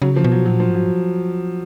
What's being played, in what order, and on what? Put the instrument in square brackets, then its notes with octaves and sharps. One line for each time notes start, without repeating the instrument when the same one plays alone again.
[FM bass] C#3 [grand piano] F#3
[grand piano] F3
[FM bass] B2
[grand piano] F#3
[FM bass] A#2 [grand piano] F#3
[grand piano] F3
[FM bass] G#2
[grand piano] F#3